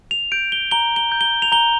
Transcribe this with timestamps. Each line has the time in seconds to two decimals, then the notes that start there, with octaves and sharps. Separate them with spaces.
0.11 F7
0.32 G6 D7
0.52 G7
0.71 A#5 G7
0.96 G7
1.12 G6
1.21 G7
1.42 F7
1.52 A#5 G7